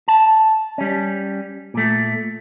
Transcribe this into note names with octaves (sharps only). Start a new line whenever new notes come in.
A5
G3 C#4
A#2 A3